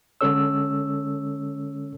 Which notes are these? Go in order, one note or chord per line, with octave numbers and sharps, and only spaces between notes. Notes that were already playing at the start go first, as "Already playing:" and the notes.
D3 G#3 C#4 A4 C#5 E6